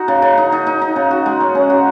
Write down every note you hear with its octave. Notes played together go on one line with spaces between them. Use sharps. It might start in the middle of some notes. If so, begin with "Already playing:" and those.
Already playing: D#4 F#4
C#3
C#3
D#4
D#4
D#4
D#4
C#3
F#4
G#3
C#4
C#4
F#4